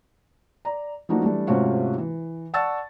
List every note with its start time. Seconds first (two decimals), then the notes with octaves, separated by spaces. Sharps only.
0.65 D5 A#5
1.09 F3 A3 A#3 D4 D#4 F#4
1.22 E3 G3 A3 D4
1.47 G#2 C3 A3 C#4 F4 F#4
1.98 E3
2.53 D5 F#5 A5 C#6 E6 A6